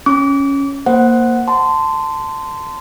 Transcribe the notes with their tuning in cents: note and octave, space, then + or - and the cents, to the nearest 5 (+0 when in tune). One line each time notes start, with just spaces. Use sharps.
C#4 +0 D6 -35
A#3 +0 C5 +0 F#5 +0
A5 +10 C6 -20